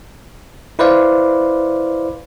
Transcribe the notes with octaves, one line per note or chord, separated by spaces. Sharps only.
E4 B4 C5 D5 F5